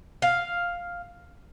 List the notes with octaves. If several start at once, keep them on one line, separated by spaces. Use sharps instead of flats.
F5